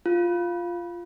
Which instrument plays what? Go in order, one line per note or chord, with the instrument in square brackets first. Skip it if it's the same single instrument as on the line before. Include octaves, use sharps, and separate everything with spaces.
[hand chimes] F4